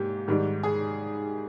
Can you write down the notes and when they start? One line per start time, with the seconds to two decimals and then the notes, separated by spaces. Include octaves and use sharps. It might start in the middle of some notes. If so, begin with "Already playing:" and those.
Already playing: G#2 A#3 G4
0.28 G#2 D#3 G3
0.63 G#4